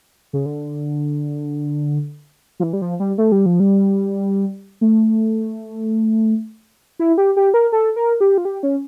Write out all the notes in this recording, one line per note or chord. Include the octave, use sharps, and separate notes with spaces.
C#3
D3
F3
E3
G3
F3
G3
A3
G3
F3
G3
A3
E4
G4
G4
A#4
A4
A#4
G4
F4
G4
C#4